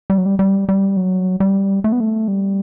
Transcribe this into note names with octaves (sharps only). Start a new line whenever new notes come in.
G3
F#3
G3
G3
G3
F#3
G3
A3
B3
A3
G3